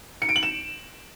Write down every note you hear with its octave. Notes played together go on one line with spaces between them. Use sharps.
C#7
D7
F#7
E7